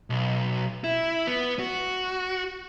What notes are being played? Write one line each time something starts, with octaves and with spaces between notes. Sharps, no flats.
B1
E4
B3
F#4